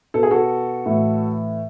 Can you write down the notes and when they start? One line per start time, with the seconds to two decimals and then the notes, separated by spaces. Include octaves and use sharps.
0.14 B2 A4
0.23 G#4
0.31 F#4 A4
0.86 A2 E3